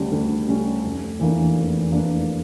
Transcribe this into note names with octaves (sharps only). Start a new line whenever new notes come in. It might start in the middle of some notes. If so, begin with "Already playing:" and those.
Already playing: D2 C#3 G3 C#4
D2
C#3 G3 C#4
F1
E2 E3 A#3 D4
F1
E2 E3 A#3 D4